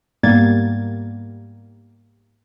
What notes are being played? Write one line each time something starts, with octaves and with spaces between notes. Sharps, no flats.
G#2 G3 A#3 B3 G#6 A6